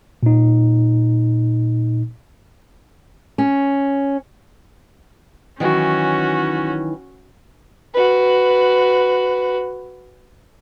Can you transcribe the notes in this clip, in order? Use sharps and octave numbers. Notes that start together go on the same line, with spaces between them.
A#2 D#4
C#4
D#3 E3 F#3 C#4 F#4
F#4 B4